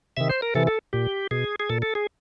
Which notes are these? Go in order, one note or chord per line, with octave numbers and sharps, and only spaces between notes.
C3 D#3 E5
C5
A#4
C3 E3 A4
A4
A#2 G4
B2 G#4
G#4
A#2 A4
A4
G#4